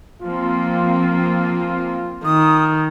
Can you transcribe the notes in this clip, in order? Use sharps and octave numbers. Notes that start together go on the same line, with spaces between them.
F3 A#3 C4 F4
D#3 D#6